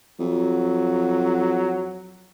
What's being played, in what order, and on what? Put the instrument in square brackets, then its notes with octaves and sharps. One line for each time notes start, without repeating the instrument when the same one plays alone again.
[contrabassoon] F2 [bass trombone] F#3